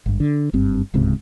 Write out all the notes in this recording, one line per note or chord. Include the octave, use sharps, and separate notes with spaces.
G#1 G2
D3
F#1 G2 C4
D1 C#2 G#2 C3